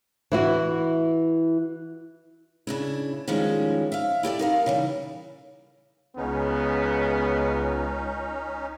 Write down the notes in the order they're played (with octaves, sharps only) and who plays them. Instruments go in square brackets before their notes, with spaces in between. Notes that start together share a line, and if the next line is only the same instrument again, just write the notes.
[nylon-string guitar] E3 E4 F#4
[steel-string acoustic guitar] C#3 D4 E4
D#3 F3 G3 G#3 C#4 E4
E5 F5
E4 G4 A4 D5
D#4 A#4 F5
C#3 E3 G3
[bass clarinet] C#2 [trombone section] C#3 B3 [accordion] C#4 D#4